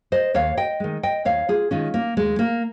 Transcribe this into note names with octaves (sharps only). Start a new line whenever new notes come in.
C5 D#5
D#2 C#5 F5
D#5 G5
D#3 G#3
D#5 G5
D#2 C#5 F5
F4 G#4
D#3 G#3 C#4 F4
A#3
D#2 G#3
A#3